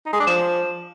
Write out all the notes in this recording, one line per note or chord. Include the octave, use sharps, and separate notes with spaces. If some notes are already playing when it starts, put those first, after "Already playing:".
D#4
G#3
D4
F3